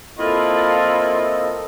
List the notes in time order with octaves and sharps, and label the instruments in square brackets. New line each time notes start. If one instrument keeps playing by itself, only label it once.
[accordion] A#3 C4 D#5 [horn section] E4 F4 [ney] A4